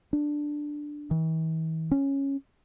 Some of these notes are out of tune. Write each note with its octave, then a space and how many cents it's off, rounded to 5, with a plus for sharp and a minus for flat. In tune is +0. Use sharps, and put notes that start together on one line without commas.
D4 +5
E3 -45
C#4 -10